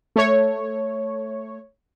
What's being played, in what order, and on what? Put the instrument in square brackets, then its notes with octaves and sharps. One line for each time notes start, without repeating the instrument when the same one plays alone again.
[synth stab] A3 C#5